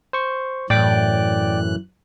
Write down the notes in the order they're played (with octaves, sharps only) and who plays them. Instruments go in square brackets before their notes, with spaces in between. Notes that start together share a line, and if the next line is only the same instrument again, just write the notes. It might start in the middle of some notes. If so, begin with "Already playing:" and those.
[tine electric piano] C5 C#6
[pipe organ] F#2 E3 F#6 [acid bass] A2 [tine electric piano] D5 G5 D6